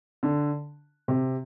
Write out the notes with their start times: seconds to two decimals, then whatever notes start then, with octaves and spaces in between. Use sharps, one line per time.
0.23 D3
1.08 C3